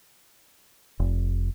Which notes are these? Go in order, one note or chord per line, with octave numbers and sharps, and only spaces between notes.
F1